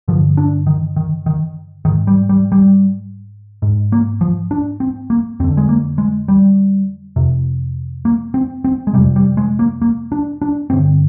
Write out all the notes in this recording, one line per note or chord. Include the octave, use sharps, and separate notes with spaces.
G2 D3 F3
D4
D#3
D#3
D#3
G#2 D#3
G3
G3
G3
G#2
A#3
F3
D4
C4
A#3
F2 D3 C4
G#3
A#3
G#3
G3
F2 C3
A#3
C4
C4
G#3
F2 C3 G3
G3
G#3
A#3
A#3
D4
D4
G2 D3 C4